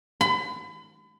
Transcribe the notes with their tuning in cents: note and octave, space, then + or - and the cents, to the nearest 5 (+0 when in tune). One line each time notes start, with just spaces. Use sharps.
B5 +35